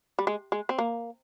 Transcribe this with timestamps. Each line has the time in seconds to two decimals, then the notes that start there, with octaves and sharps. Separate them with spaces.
0.19 G3
0.27 G#3
0.52 G#3
0.69 C4
0.78 A#3